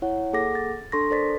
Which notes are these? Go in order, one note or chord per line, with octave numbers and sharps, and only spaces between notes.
E4 C#5 F#5
A#3 G#4 A4 F#5 D6 A#6
A6
D4 A4 C6 C#6 A#6
A4 A#4 C5 D5 A6 B6